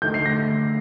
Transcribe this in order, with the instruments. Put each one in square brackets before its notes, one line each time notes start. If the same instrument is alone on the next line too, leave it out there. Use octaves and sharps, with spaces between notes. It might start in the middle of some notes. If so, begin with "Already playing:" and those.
[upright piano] D2 D3 A3 D#4 G6
C7
A#6